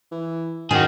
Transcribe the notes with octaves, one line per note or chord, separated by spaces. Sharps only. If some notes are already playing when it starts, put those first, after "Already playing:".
E3
F#2 D#3 F#4 G#4